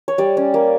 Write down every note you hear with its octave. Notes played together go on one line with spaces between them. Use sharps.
C#5
G3 D5
C#4
A#3